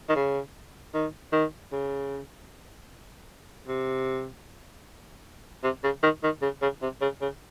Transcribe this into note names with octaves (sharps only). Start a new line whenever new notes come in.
D#3
C#3
D#3
D#3
C#3
C3
C3
C#3
D#3
D#3
C#3
C#3
C3
C#3
C#3